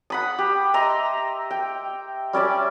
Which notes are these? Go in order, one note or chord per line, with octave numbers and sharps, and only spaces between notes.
F#5 B5 D#6
G4
D#5 E5 A#5 C6
G5
G3 C#4 D5 E5